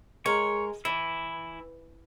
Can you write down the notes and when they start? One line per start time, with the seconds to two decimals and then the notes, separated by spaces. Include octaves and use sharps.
0.26 G#3 A#4 C#5
0.85 E3 E4